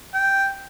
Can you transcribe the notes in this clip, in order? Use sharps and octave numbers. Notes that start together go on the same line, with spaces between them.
G5